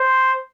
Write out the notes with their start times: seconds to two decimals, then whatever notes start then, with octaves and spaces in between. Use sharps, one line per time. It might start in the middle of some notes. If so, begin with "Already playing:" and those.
Already playing: C5